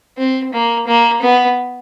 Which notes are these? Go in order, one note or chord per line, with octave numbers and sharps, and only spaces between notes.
C4
A#3
A#3
B3